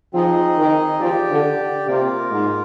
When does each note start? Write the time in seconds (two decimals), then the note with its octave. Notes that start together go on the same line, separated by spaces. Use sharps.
0.13 F3 C4 D#4 G#4 D#5
0.57 D#3
1.00 F3 G4 D5 G5
1.30 D3
1.58 D3
1.87 C3 A#3 F4 A#4
2.31 G#2